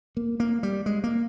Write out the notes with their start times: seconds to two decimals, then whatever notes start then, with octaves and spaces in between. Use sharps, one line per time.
0.17 A#3
0.40 A#3
0.63 G3
0.86 G#3
1.04 A#3